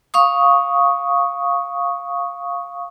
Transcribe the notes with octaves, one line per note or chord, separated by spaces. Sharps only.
F5 C#6 D#6